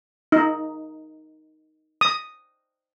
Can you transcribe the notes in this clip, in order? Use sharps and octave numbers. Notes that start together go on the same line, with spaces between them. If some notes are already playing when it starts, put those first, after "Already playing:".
D#4
D#6